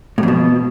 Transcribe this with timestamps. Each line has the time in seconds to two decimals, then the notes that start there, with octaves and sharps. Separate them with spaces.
0.18 A2
0.23 F2
0.28 B2